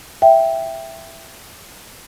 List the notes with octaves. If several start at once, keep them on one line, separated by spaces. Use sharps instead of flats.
E5 G5